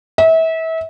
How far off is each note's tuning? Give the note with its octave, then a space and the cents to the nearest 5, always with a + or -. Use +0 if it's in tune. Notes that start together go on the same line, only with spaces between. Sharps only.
E5 -30